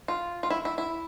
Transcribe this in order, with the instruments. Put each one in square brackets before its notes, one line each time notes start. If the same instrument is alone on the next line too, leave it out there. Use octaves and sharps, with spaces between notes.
[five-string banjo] F4
F4
E4
E4
E4